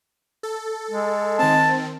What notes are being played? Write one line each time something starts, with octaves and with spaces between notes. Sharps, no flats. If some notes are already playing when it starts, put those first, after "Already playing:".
A4
G#3
D#3 C4 A5